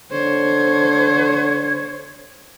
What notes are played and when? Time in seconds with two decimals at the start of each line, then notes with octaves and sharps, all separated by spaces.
0.12 D3 C5 C#5 G#6